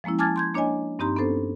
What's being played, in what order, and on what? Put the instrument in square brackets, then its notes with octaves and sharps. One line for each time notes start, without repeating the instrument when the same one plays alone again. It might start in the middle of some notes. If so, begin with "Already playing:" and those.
[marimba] F3 G#3 A#3 C#4 E4
G#5 A5 D6 F6 G#6 A6
C6 G6 G#6
A#3 D4 C#5 D#5 G#5
G2 C4 D#4 G4 A#5 C6
B3 C#4 D4 A4 C5